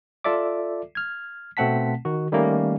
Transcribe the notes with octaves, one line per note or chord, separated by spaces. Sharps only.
F4 A4 D5 E5 D6
F6 G#6
B2 A3 C4 F#5 A5 B6
D#3 F#4
D#3 G3 A3 A#3 C#4